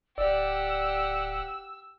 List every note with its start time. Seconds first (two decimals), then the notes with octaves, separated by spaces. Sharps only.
0.18 D1 G4 D5 F#5 E6